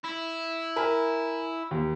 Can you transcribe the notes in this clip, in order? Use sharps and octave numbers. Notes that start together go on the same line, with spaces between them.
E4
A#4 G#5 B5
D#2